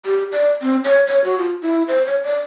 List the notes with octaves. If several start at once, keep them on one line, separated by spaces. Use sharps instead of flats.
G4
D5
C4
C#5
C#5
F#4
F4
E4
C5
C#5
D5